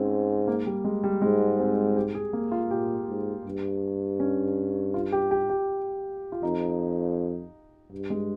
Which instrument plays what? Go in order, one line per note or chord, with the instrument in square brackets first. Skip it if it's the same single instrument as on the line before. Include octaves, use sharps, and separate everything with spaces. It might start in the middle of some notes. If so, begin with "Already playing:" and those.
Already playing: [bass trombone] G#2 [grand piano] C4 C#4
[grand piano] A#3
G3
G#3
G3
[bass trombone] G#2 [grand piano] G#3
[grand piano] C4
G4
G#4
A#3
F4
[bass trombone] A#2 [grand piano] G4
[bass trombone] G#2
G2
[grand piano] C#4
F4
G4
G4
G4
F4
[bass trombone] F2 [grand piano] D#4
[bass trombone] G2
[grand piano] G#3